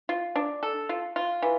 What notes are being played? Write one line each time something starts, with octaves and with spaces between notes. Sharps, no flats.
F4
D4
A4
F4
F4
E3